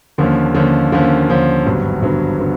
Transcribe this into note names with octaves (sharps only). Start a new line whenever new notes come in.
D#2 D3 F3 A#3 C#4
D#2 D3 F3 A#3 C#4
D#2 D3 F3 A#3 C#4
D#2 D3 F3 A#3 C#4
G#1 G2 D3 F#3 B3
G#1 G2 D3 F#3 B3
D3 F#3 B3